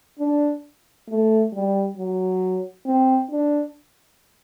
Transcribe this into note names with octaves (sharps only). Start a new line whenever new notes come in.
D4
A3
G3
F#3
C4
D4